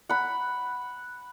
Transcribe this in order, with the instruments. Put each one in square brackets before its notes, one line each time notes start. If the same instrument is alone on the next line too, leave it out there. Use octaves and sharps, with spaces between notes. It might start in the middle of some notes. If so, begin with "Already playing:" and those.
[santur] F#5 B5